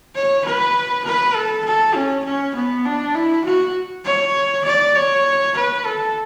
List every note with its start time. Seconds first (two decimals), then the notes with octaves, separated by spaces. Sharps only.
0.15 C#5
0.45 B4
1.05 B4
1.35 A4
1.65 A4
1.95 C#4
2.25 C#4
2.55 B3
2.85 D4
3.15 E4
3.45 F#4
4.05 C#5
4.65 D5
4.95 C#5
5.55 B4
5.85 A4